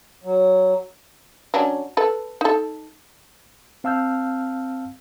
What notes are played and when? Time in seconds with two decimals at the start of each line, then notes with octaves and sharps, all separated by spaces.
0.24 F#3
1.54 F#3 C#4 D4
1.97 A4 B4
2.41 D#4 A4
3.84 C4 F5 A5 E6 F6 G6